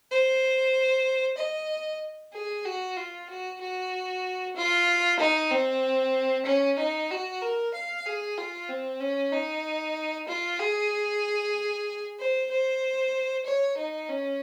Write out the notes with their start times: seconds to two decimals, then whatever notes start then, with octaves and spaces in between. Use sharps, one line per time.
0.11 C5
1.37 D#5
2.33 G#4
2.65 F#4
2.97 F4
3.29 F#4
3.61 F#4
4.56 F4
5.19 D#4
5.51 C4
6.46 C#4
6.78 D#4
7.10 F#4
7.42 A#4
7.74 F5
8.06 G#4
8.38 F4
8.69 C4
9.00 C#4
9.32 D#4
10.28 F4
10.59 G#4
12.19 C5
12.51 C5
13.46 C#5
13.77 D#4
14.09 C#4